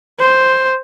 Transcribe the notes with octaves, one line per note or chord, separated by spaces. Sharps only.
C5